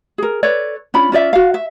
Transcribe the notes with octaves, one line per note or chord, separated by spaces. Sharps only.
G#4 A#4
A4 B4 C#5 D5
C#4 D4 F4 B5
C#4 F4 D5 E5
F#4 F5
E5